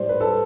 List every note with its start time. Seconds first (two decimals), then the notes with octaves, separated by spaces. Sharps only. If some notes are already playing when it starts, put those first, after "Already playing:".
Already playing: A2 G3 C5 D5
0.09 B4
0.21 A4